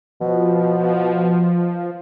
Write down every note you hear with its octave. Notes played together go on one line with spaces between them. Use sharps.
B2 F3